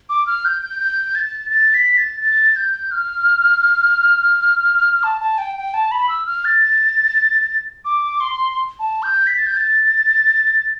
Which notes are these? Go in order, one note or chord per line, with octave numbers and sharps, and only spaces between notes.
D6
F6
G6
G6
G6
A6
A6
B6
A6
A6
G6
F6
A5
A5
G5
G5
A5
B5
E6
F6
A6
D6
C6
A5
G6
B6
A6
G6
A6